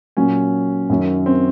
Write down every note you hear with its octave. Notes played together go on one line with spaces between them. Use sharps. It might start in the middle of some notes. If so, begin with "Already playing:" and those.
A#2 F#3 C#4
F#2 D#3 F#3
C4